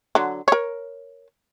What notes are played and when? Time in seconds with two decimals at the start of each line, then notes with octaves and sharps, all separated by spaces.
0.15 D3 F#3
0.48 A#4 C#5